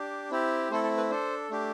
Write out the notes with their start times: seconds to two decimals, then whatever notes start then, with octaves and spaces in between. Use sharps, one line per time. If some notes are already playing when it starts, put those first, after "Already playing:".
Already playing: D4 G4
0.31 C4 E4 G4
0.70 A3 C4 E4 A4 C5
0.84 A4
0.97 B4
1.10 D4 A4 C5
1.50 A3 D4 G4